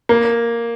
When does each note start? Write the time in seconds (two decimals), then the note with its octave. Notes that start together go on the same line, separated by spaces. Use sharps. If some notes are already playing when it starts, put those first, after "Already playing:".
0.09 A#3